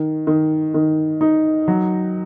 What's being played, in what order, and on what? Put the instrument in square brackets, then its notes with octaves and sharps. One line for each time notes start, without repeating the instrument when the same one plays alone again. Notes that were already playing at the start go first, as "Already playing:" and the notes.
Already playing: [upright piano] D#3
D#3
D#3
D#4
F#3